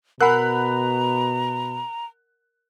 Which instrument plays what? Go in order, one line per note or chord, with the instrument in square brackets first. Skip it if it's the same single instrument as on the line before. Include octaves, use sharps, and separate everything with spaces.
[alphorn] B2 [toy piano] A#4 F#5 G#5 [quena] A#5 [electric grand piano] B5 F#6